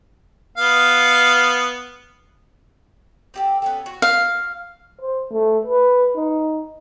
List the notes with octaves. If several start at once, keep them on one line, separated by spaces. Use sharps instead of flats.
B3 F5
C4 G4 A4
B3 C#4 A4
F#4
F5
C5
A3
B4
D#4